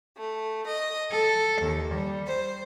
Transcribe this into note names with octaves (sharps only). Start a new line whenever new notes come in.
A3
D#5
A4
D#2
G3
C5